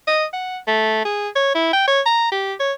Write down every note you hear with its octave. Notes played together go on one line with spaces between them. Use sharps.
D#5
F#5
A3
G#4
C#5
E4
G5
C#5
A#5
G4
C#5